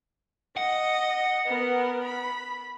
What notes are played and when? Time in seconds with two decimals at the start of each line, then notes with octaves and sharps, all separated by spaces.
0.57 D#5 F#5
1.47 B3 A#4
2.04 B5